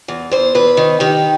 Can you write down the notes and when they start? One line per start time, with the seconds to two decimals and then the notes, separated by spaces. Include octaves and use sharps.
0.08 E2
0.31 E2 C5
0.55 E2 B4
0.77 D#3
1.00 D#3 G4